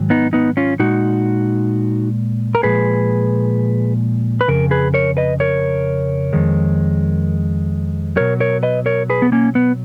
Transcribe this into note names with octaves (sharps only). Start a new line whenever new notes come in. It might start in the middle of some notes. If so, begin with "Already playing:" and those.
Already playing: G#2 D#3 F#3
B3 D#4
B3 D#4
C#4 F4
A#2 G#3 D#4 F#4
A#4
A#2 F3 G#3 G#4 B4
B4
F2 C#3 A#4
G#4 B4
A#4 C#5
B4 D#5
A#4 C#5
F2 D#3 G#3
B2 F#3 A#4 C#5
A#4 C#5
B4 D#5
A#4 C#5
G#4 B4
B3
A#3 C#4
B3